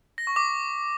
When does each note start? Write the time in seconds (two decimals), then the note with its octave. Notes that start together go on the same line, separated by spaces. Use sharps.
0.18 A#6
0.27 C#6
0.36 D6